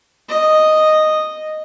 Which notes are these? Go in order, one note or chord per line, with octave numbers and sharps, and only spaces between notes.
D#5